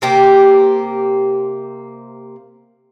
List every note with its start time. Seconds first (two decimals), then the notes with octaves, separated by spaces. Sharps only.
0.02 C3 A#3 G4